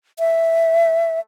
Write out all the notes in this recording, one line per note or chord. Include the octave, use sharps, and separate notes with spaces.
E5